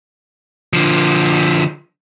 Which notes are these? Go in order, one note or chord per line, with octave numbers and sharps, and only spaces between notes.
D3 F3